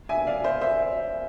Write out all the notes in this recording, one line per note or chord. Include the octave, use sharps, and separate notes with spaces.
E5 G#5
D5 F5
C5 E5
C5 E5